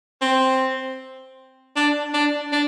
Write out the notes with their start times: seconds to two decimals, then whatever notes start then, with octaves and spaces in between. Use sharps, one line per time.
0.22 C4
1.76 D4
2.14 D4
2.52 D4